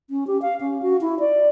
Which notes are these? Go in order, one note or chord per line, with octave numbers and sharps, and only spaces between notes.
C#4
G4
F5
C#4
F#4
E4
D5